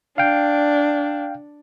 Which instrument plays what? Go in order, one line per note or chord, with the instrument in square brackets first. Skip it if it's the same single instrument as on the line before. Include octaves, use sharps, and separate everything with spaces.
[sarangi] D4 [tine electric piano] F5 G5